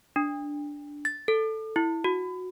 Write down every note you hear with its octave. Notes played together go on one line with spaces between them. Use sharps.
D4
A6
A4
E4
F#4